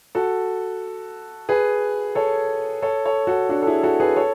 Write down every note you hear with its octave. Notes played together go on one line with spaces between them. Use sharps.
F#4 A4
G#4 B4
A4 C#5
A4 C#5
A4 C#5
F#4 A4
D4 F#4
A4
E4 G#4
F#4 A4
G#4 B4
A4 C#5